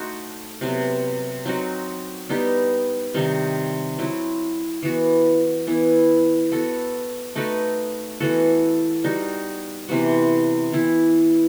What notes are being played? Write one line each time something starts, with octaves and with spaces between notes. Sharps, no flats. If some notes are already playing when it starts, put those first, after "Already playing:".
Already playing: A3 D#4 F#4 C5
C3 F#3 B3
F#3 C4 D#4 F#4
G3 B3 D#4 G4
C3 D#3 G3 D#4
F#3 C4 E4
E3 B3 F#4
E3 B3 E4
B3 F#4 A4
A3 D#4 F#4 B4
E3 B3 F#4 A4
G3 D#4 F#4
C3 E3 B3 F#4
E3 B3 E4